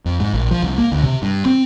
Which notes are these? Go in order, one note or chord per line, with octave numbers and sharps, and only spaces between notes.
F2
G#2
A#1
F3
C2
A#3
D2
C3
G2
C4